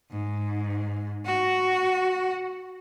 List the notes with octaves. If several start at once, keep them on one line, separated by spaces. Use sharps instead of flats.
G#2
F#4